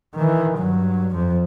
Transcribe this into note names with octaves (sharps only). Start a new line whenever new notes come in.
D#3 E3
G2 F#3
F2 F3